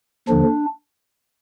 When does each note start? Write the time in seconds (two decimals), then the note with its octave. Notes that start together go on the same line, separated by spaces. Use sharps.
0.28 D#2 D3 F3 D4